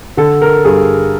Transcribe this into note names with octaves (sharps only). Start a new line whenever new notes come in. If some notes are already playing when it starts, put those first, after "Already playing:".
D3 A4
A#4
G2 G#4